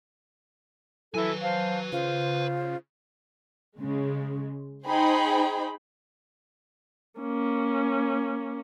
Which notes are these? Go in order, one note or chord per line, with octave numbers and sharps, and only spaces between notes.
F#3 E4 A4 B4 G#5
C5 F5 A5
C#3 F4 C5
C#3 G#3
D#4 G#4 C5 G5 B5
A#3 C#4